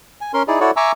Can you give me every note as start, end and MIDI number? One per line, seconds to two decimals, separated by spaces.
0.21 0.32 80
0.34 0.43 61
0.34 0.43 70
0.34 0.43 84
0.48 0.60 63
0.48 0.60 64
0.48 0.60 68
0.48 0.60 74
0.60 0.71 64
0.60 0.71 66
0.60 0.71 69
0.60 0.71 73
0.60 0.71 74
0.77 0.92 76
0.77 0.92 80
0.77 0.92 82
0.77 0.92 85
0.77 0.92 86
0.77 0.92 88